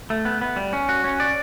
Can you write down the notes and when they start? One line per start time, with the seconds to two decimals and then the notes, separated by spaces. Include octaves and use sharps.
0.10 A3
0.25 B3
0.41 B3
0.56 G3
0.73 C#4
0.89 F#4
1.04 C#4
1.20 D5